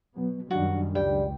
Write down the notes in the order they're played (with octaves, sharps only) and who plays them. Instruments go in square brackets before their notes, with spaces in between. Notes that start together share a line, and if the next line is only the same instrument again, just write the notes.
[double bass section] B2 [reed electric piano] F#3 B3
[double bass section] F#2 D#3 G3 [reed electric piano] F#3 D4 [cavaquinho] F#4
[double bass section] C#2 [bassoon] G3 [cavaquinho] G5